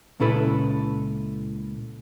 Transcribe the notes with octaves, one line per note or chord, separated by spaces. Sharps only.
C#2 A#2 C#4 E4 A4 B4